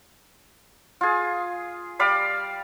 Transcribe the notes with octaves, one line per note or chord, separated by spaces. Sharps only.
F4 G#4
G3 D5 F5 B5